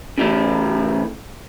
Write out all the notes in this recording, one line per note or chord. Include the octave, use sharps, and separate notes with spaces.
C#3 E3 A3